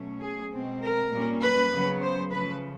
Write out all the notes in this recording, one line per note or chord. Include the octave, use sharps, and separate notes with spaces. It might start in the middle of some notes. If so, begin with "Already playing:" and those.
Already playing: B2 F#3 A3 C#4
G#4
B2 G#3 C4
A#4
A#2 G3 A#3 C#4
B4
C#3 F#3 B3
C5
C#3 F3 A3 B4